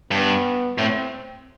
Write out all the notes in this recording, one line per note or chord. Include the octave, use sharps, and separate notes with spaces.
G2 B3
A2 C4